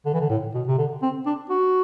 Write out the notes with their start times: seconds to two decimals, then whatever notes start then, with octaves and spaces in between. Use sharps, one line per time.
0.06 D3
0.14 E3
0.21 D3
0.30 A2
0.55 B2
0.68 C3
0.78 D3
1.02 C4
1.26 D4
1.50 F#4